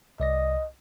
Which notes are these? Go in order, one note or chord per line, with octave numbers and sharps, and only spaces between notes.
C2 D5 D#5 A#6